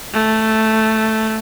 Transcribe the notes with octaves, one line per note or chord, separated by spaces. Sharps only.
A3